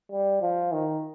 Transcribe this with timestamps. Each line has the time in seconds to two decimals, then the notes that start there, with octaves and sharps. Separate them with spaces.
0.12 G3
0.42 F3
0.72 D#3